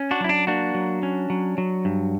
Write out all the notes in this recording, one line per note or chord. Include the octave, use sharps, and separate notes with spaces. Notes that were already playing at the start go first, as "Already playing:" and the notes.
Already playing: C#4
D4 F#4
F#3 E4
D4
A#3 D4 F#4
F#3
C#4
F#3
F#3
G2